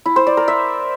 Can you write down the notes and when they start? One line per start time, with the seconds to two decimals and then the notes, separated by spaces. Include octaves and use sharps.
0.06 E4
0.16 C5
0.27 D5
0.37 A#4
0.48 E5